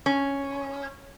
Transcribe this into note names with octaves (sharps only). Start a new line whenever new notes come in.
C#4